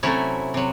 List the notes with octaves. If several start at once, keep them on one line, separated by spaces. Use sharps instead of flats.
C3 F#3 A3 C#4 E4
C3 F#3